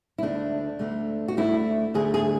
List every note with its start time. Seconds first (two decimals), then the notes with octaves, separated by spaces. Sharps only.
0.18 E4
0.22 D2 D3 A3 D4
0.79 D2 D3 A3
1.28 F#4
1.37 D2 D3 A3 E4
1.94 D2 D3 A3 G#4
2.14 G#4